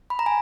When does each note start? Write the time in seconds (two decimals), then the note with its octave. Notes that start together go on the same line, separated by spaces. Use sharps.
0.10 B5
0.19 A#5
0.26 G#5